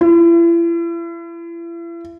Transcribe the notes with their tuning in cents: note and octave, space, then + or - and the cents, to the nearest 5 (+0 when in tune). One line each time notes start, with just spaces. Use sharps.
E4 +40